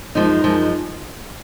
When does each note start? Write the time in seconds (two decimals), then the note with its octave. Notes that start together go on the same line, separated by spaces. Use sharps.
0.15 F#2 F3 G#3 D#4
0.44 F#2 F3 G#3